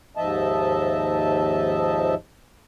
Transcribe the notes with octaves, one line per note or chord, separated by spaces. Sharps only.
D#2 G#2 F3 D#5 E5 A5